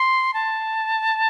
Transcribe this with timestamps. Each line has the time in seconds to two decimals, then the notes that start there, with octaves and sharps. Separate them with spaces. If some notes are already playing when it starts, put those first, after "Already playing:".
Already playing: C6
0.34 A5